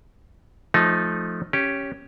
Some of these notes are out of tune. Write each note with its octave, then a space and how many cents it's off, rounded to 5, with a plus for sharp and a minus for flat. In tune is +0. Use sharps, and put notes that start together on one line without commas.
F3 +0 A3 -15 D#4 +0
C#4 +0 G4 +0